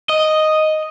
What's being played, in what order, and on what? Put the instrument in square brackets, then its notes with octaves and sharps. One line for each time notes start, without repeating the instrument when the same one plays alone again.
[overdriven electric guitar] D#5